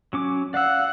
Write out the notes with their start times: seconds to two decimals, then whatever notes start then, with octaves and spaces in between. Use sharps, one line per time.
0.13 F#3 C#4 D6
0.54 D5 F5 F#5 E6